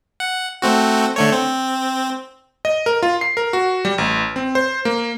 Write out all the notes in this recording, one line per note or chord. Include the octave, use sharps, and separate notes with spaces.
F#5
A3 C4 F#4
D3 A3 C#5
C4
D#5
A#4
F4
C7
A#4
F#4
G3
A1
C4
C5
A#3